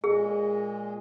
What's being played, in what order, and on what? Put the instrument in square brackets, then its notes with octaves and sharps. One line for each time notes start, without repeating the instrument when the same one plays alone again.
[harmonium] A#2 G#3 [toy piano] G#4